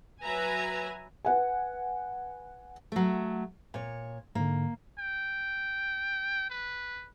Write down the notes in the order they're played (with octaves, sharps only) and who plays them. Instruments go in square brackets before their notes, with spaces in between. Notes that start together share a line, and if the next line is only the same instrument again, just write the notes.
[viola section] F#3 B4 E5 G#5 A#5
[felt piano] B4 F#5 G#5
[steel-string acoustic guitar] F#3 A3
A#2 C#5
[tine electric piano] G#2 D3 [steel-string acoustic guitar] A#3
[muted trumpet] G5
B4